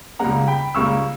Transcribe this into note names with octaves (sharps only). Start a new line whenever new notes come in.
C#2 C#3 G3 A#3 F#5 A#5
G5 B5
C#2 C#3 G3 A#3 C#6 E6